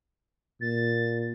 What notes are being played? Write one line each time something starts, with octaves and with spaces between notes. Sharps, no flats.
A#2 A6